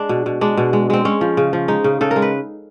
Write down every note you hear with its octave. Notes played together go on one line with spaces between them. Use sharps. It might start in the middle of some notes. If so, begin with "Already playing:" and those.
Already playing: G#3 D4
B2
B2
G#3 D4
B2
G#3
G#3 C4
G#3 C#4
F3
C#3
F3
G#3 D#4
C#3
C#3 A4
A#4
G#3
B4